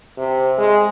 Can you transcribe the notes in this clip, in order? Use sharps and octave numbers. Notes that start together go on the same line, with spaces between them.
C3
G#3